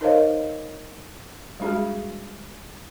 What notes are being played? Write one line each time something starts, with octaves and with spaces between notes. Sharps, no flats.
D#4 A#4 C5 C#5 D#5 F5
G3 G#3 D4 F#4 G#4